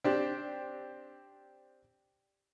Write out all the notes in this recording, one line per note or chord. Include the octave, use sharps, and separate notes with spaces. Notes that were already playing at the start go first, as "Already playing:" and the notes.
C4 D4 G4